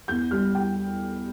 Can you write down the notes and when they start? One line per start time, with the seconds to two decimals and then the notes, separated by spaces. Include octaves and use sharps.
0.08 E2 G6
0.31 G3 F6
0.55 G5